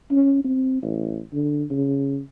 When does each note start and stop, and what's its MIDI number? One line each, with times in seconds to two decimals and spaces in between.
0.11 0.42 61
0.44 0.80 60
0.83 1.20 33
1.33 1.64 50
1.70 2.20 49